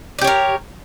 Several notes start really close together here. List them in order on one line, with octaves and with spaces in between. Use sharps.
D5 G4 C#5 A#4